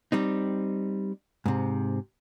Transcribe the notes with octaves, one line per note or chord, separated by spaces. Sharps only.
G3 C4 D#4
G#2 C3